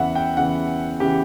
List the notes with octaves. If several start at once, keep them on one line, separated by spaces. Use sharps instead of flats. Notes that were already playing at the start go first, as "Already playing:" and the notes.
Already playing: E2 C#3 E3 E5 F#5
G5
E2 C#3 E3 F#5
C#3 E3 G4